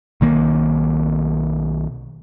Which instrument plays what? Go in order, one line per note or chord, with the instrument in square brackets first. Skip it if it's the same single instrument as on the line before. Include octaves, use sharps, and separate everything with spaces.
[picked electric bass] B1 D#3 A#3